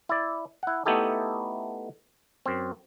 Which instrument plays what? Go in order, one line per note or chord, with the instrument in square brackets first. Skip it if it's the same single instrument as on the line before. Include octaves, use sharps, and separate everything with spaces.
[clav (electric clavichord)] E4 D5
E4 F#5
A3 B3 D#4 E4 G4 A4
F#2 C4